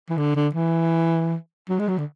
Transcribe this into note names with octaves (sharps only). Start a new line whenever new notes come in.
E3
D3
D3
E3
F#3
G#3
F#3
D3